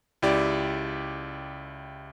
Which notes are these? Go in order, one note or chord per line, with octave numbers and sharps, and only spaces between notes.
C#2 E4 G4 D5